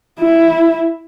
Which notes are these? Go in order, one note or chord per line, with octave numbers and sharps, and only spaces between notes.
E4